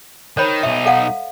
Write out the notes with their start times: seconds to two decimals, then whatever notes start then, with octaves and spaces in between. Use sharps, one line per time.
0.37 D#3 C5 C#5 B5
0.63 B1 D#4 E5
0.86 A4 F5 F#5